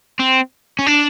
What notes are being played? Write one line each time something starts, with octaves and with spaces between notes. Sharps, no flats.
C4
C#4
D4